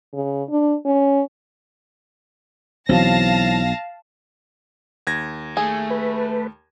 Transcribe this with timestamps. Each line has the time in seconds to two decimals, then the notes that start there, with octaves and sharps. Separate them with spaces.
0.13 C#3
0.50 D4
0.85 C#4
2.89 B1 E3 F#3 C4 F5 A5 A#6
5.07 D#2 G#6 A#6
5.57 A3 G#4
5.90 B4